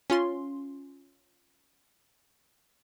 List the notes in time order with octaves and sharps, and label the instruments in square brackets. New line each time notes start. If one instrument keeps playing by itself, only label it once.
[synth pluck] C#4 F4 C6